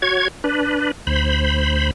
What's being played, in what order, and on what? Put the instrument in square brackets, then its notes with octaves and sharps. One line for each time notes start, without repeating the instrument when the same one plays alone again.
[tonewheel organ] F#4 C#5 G#6
D4 B4
D2 C5 B5